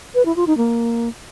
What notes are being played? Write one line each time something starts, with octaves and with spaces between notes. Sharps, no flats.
B4
E4
F4
D#4
A#3